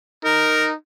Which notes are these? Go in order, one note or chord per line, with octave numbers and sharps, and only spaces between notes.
D#4 A#4